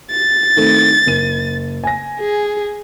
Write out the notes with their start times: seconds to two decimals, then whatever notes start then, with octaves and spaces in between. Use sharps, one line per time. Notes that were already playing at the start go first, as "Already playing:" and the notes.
0.12 A6
0.57 D#3 A3 C4
1.06 F#1 D#7
1.84 G#5 A#6
2.20 G#4